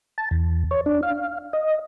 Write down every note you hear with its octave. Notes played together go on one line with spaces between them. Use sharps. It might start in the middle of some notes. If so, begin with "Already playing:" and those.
A5
E2
C#5
D4
F5
D#5